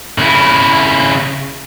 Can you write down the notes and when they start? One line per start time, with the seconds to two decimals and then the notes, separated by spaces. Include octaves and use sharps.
0.18 C#3 E4